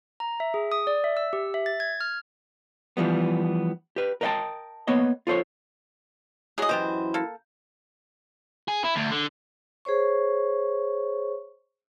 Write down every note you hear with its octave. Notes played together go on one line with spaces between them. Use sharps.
A#5
E5
G#4
D#6
D5
E5
E6
G4
E5
A6
G#6
F6
E3 F3 G3 B3
G4 B4
A#4 B4 D#5 E5 G5 A5
A#3 B3 C#5 D#5
F4 A4 C5 C#5
E3 F#3 G#3 G#4 D#5
F#2 E3 F#3 B3 G4 C5 D#5
A#3 A4
G#4
E4
D2
D3
G#4 C5 C#5 C#6